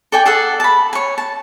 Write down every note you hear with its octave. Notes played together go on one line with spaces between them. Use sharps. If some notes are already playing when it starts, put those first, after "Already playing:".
A4 D5 G5 G#5
G#4 A4 D5 F#5
A5 B5
C#5 G#5
A5